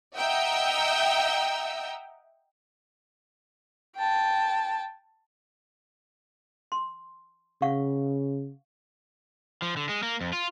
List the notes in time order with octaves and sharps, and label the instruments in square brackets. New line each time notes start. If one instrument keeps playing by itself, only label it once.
[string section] D#5 E5 F#5 G5 A#5 E6
[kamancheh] G5 A5
[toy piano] C6
[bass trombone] C#3 [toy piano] F5 F#5 C#6
[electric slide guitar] F3
D3
G#3
A#3
F2
F4